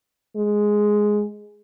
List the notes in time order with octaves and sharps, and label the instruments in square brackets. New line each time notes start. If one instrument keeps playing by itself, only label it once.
[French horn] G#3